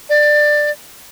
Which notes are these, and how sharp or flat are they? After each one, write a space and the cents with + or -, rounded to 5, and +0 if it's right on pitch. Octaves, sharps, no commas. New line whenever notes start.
D5 +15